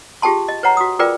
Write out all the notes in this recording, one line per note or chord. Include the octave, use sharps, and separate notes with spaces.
F4 G4 G#4 G5 A5 C6
D#5
B4 C#5 F#5 A#5
F#4 D#6
F4 G#4 A#4 B4 D5 G5